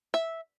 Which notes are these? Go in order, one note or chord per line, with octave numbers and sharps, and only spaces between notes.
E5